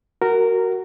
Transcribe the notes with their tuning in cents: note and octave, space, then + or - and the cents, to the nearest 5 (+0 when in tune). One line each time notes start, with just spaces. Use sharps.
F#4 +15 A#4 -10